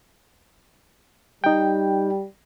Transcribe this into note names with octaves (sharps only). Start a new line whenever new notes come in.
G3 D#4 G5